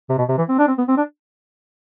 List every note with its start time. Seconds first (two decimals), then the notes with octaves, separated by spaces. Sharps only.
0.09 C3
0.18 B2
0.29 C3
0.38 E3
0.49 C4
0.59 D4
0.68 C4
0.78 B3
0.88 C4
0.97 D4